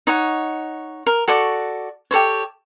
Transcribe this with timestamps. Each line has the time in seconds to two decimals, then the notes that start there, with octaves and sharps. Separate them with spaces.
0.07 D#4 C#5 F#5
1.06 A#4
1.28 F#4 A4 D5 C#6
2.11 G4 A4 C5 C#5